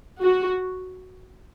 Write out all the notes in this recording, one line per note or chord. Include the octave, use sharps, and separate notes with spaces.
F#4